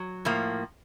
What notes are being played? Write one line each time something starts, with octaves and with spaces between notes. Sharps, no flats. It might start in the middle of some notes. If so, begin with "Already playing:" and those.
Already playing: F#3
A2 F3 A#3